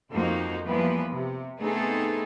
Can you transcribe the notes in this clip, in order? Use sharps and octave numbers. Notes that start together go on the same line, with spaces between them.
F2 F3 A#3 D#4 F#4 C5
E3 F3 G3 A#3 B3 B4
C3
A3 B3 C4 D#4 G#4 A4